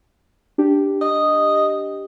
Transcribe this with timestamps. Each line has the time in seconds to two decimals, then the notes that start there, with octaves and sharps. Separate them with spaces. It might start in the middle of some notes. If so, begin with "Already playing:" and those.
0.58 D4 G4
1.01 D#5